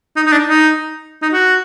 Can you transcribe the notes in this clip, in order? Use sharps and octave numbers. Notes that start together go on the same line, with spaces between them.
D#4
D#4
D4
D#4
D#4
F#4